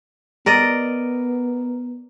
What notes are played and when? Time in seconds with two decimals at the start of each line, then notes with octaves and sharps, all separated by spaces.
0.46 B3 A#4 D5 D#5